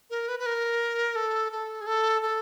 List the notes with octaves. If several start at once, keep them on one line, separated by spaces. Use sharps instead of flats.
A#4
B4
B4
A#4
A4
A4
G#4
A4
A4